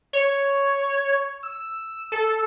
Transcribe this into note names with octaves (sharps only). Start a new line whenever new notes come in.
C#5
E6
A4